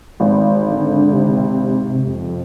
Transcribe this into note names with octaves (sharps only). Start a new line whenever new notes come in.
G#1
D3
C3
F2